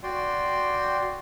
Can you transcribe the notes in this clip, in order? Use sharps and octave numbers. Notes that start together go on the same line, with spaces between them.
F#4 D5 G5 C6